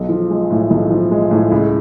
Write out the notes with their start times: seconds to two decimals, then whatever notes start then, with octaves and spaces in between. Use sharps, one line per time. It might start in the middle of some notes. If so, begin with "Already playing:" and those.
Already playing: B1
0.09 F3
0.30 G#3
0.50 A2
0.71 B1
0.90 F3
1.11 G#3
1.31 A2
1.51 C#2